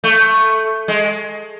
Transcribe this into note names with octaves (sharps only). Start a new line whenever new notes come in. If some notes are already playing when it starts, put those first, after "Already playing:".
A3
G#3